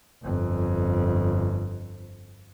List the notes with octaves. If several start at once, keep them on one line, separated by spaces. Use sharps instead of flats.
G1 F2